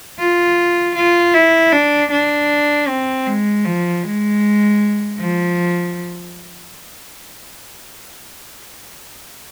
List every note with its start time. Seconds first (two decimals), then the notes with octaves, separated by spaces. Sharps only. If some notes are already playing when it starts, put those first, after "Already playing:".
0.19 F4
0.95 F4
1.34 E4
1.72 D4
2.11 D4
2.88 C4
3.26 G#3
3.65 F3
4.03 G#3
5.19 F3